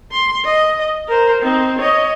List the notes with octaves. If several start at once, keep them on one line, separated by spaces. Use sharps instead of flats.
C6
D#5
A#4 C5
C4 D#4
C#5 D#5